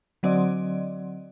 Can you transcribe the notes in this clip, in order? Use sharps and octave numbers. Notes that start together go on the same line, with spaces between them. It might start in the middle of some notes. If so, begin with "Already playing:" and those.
D3 F#3 C4 D5 D#5